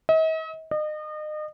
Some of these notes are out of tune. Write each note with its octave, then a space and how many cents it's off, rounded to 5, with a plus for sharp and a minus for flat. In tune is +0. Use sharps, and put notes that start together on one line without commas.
D#5 +45
D#5 -35